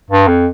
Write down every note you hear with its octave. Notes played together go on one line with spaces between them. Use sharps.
G2
F2